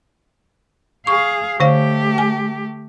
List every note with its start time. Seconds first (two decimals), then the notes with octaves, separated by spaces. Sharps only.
1.07 G#4 F5 C#6
1.60 D3 A3 G4 C5 F5
2.18 G#5